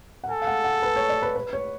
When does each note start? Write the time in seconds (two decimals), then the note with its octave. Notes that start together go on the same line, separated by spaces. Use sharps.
0.24 F#5
0.29 A4 G#5
0.42 F5
0.47 F#5
0.64 F#5
0.82 B4
0.96 C#5
1.09 D5
1.22 B4
1.36 B4
1.53 C#5